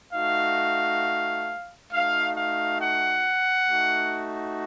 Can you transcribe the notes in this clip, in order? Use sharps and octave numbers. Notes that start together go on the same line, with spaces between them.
A3 D#4 F#4 F5
A3 D#4 F#4 F5
F5
F#5
A3 D#4 F#4